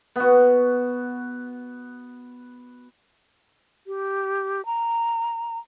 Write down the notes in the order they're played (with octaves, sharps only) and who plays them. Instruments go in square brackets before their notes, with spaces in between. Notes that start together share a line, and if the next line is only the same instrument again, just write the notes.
[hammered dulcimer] B3 F#4
[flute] G4
A#5